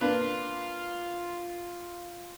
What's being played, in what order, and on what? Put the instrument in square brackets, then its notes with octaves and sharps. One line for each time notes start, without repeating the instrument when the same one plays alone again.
[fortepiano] A#3 D4 B4 [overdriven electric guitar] F4